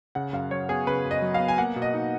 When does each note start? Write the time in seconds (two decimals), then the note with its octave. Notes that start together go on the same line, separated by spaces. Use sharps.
0.15 C#3 F#5
0.33 F#2 F5
0.51 F#3 C#5
0.69 B3 G#4
0.87 C#3 B4
1.05 F#2
1.11 D#5
1.22 F#3
1.34 F5
1.40 B3
1.48 G#5
1.58 A#3 F#5
1.76 B2
1.82 D#5
1.94 D#4